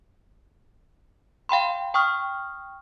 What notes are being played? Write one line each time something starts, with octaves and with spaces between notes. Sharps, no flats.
F5 G5 B5 C6
G5 C#6 D#6 F6